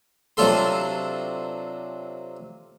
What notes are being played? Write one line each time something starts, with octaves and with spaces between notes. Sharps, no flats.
C3 F#3 D4 F4 A4 C6